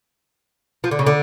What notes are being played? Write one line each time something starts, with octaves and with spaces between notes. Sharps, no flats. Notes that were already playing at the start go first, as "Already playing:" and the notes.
F3
D3
C#3
D3